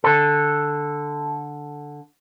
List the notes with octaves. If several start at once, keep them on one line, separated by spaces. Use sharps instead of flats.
D3 A4